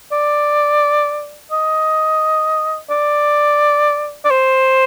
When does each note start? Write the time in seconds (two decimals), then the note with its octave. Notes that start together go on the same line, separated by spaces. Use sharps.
0.12 D5
1.51 D#5
2.90 D5
4.25 D5
4.30 C5